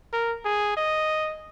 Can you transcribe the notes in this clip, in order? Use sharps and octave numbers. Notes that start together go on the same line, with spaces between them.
A#4
G#4
D#5